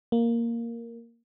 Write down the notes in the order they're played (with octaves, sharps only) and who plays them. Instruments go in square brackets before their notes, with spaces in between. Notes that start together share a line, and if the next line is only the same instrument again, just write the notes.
[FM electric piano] A#3